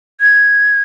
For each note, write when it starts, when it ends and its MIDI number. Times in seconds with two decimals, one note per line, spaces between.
0.21 0.83 92